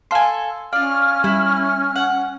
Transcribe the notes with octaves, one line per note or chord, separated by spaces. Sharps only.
A4 F5 G#5 C6
C#4 F4 D5 F5 F6
G3 E4
F#5